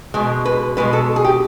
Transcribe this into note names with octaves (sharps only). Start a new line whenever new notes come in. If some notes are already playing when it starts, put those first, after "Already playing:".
B2 G#3
B4
B2 G#3 B4
A4
G#4
G4